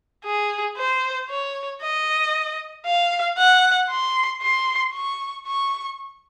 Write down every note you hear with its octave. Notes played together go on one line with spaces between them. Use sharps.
G#4
C5
C#5
D#5
F5
F#5
C6
C6
C#6
C#6